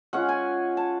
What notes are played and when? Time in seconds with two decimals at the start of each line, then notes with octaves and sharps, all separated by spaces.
0.13 G#3 C#4 F4 F#5
0.29 G#5
0.77 A5